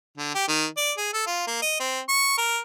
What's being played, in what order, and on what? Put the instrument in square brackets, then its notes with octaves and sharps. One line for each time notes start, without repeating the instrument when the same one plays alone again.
[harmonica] D3
G4
D#3
D5
G#4
A4
F4
A#3
D#5
C4
C#6
A#4